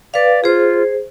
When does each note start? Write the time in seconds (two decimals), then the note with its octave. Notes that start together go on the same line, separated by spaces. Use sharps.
0.14 B4 D5 F5
0.44 F4 G#4 C5